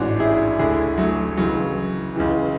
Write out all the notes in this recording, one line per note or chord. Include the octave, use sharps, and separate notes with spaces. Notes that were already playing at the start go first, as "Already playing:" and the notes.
Already playing: A1 G#2 E3 D4 F#4
E4 G#4
D2 D3 E4 G#4
F#3 A3
C#2 C#3 E3 F#3
C#2 C#3 E3